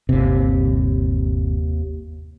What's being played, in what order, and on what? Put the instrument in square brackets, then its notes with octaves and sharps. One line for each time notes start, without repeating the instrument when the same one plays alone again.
[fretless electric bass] G1 C3 [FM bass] D#2